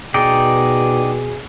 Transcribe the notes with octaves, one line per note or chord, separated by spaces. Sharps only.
B2 D#4 G#4 D5 G5